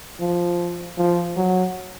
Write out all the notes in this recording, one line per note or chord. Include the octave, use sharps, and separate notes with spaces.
F3
F3
F#3